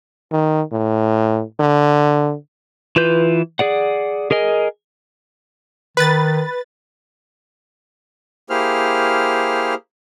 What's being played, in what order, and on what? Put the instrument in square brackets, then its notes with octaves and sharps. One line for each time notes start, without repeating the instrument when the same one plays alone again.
[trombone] D#3
A2
D3
[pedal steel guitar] E3 F4 B4 G6
G#4 D5 F#5
G#4 A#4 D#5 G#5
[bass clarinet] D#3 [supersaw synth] B4 A6
[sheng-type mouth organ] A#3 E4 G4 G#4 C5 F6